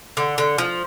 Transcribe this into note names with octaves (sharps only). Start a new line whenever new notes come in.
D3
D3
F3